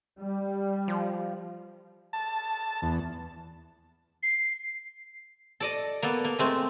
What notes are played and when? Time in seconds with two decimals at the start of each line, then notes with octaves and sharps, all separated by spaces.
0.20 G3
0.88 F3
2.13 A5
2.82 E2
4.23 C7
5.60 A4 D5 D#5
6.02 A#3 B3 A4
6.25 A#3
6.39 G#3 A3 C4